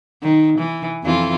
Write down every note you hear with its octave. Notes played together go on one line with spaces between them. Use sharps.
D#3
E3
F2 E3 F4